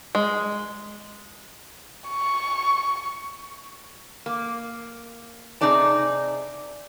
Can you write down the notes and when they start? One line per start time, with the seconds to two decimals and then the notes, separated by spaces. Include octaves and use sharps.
0.15 G#3
2.08 C#6
4.26 A#3
5.61 C3 D#4 G#4 D5 A5